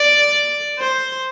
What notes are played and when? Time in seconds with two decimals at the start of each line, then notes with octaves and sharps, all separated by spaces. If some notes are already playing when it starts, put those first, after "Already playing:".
Already playing: D5
0.79 C5